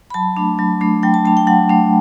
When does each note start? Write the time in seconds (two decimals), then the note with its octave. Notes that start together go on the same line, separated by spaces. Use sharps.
0.10 B5
0.14 F#3 A5
0.37 A3 D4
0.59 F#3
0.81 A3 D4
1.03 F#3 G5
1.14 A5
1.25 A3 D4 A5
1.37 G5
1.47 F#3 F#5
1.69 A3 D4